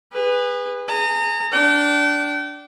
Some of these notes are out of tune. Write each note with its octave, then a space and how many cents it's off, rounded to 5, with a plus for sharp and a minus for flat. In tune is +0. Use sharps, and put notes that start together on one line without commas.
G#4 -35 B4 +0
G#4 +0 A#5 -35
D4 -10 G5 -35